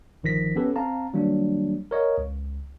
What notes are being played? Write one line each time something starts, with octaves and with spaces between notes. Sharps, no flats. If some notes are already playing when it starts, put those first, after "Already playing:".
G1 D#3 F3 A#6 B6
B3 C#4 G4 A4 B4
C4 F5 A5 A#5
D#3 F#3 G3 A#3 D4
A#4 C#5 D#5 F5
C#2